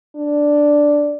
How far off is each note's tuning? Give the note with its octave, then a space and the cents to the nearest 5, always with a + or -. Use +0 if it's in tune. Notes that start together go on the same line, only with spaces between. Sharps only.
D4 +0